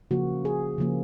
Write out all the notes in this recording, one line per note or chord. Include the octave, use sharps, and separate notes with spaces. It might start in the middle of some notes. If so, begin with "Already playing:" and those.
C#3 F3 A#3 F#4
G#4
C#3 F3 A#3